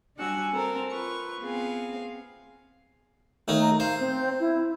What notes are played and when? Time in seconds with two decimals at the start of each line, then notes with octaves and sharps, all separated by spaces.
0.17 G3 D4 F#4 F#5 G#5 E6
0.52 C4 A4 A#4 C5
0.90 F4 B4 C#6
1.40 B3 C4 G#4 F5
3.48 D#2 A3 D#4
3.61 A#5
3.80 C5 F5
4.00 C4
4.40 E4